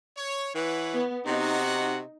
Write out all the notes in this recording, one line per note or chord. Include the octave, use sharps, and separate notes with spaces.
C#5
E3 B4 C#5 F#5
B3
C3 D#4 F#4 D#5 F#5